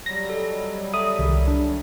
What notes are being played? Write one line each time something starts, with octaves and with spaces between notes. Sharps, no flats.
F#3 G3 A#6
A4 D#5
A4 E5 D#6
C2 D#3
D4